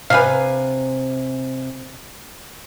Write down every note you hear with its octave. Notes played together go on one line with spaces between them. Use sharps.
C3 B4 D#5 F5 G#5